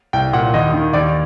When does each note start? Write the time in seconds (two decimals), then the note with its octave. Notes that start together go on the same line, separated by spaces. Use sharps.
0.13 C2 G5
0.33 A#2 F#5
0.54 D#2 D#5
0.74 D#3
0.93 D#2 D5